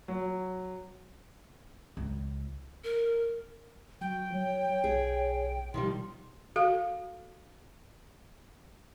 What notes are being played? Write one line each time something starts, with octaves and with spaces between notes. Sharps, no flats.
F#3
C#2
A#4
F#3 F#4 G5
F#3 C#5
B1 G#4
B2 D#3 F3 G3 C6
F#4 A4 F5